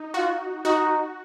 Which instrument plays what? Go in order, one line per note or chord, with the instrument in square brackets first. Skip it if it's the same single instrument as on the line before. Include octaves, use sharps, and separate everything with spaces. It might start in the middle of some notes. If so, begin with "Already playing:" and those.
Already playing: [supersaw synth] D#4
[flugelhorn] F4 [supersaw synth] F#4
[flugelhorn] D#4 [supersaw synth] F#4